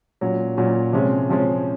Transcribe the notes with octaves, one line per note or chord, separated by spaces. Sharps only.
A#2 F#3 C#4
A#2 F#3 C#4
C3 F3 G#3 C#4
C3 F3 G#3 C#4